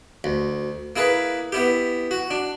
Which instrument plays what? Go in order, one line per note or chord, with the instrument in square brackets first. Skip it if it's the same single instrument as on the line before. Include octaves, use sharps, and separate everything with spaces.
[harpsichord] D2
A#3 E4 G#4 B4
B3 E4 G4
F#4
D4